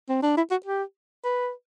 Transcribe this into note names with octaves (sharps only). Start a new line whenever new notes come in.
C4
D4
E4
F#4
G4
B4